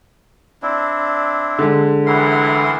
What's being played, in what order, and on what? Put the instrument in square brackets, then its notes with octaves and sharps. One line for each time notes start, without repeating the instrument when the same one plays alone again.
[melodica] C4 D4 E4
[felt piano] D3 G#3
[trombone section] F#2 A2 E3 [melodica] A#4 F#5 C6